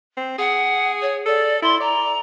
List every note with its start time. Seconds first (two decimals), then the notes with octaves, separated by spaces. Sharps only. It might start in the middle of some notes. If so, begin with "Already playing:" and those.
0.17 C4
0.39 G#4 F#5
1.01 C#5
1.26 A4 D5
1.62 E4 C6
1.80 D5 A#5